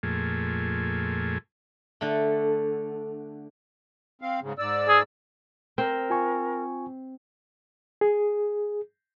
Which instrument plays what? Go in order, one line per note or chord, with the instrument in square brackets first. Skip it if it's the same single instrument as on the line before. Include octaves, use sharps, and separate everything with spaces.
[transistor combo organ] F2 A#2 A3 G#4
[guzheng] D3 A3
[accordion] C4 F5
G#2 C#3
G#2 D5 E6
[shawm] G#4
[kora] C4 [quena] A#4
[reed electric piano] F4 G#5 C#6
G#4